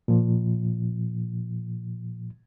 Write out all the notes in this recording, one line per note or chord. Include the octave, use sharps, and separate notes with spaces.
A#2 F3